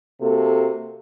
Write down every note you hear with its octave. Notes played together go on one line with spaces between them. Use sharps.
C3 A#3 F#4 A4